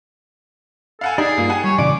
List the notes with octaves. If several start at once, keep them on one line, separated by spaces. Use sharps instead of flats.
A4 F5 F#5 G#5
D#4 G4 G#4 D5
G2 A#3 F4
G4 F#5 G#5
G3 C#5
A#2 C#3 E3 D5 D6